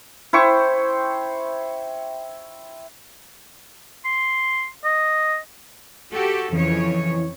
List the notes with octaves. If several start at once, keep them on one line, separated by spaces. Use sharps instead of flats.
E4 C5 G5 C#6
C6
D#5
F#4 G4 A4
F2 C#3 E3 C#5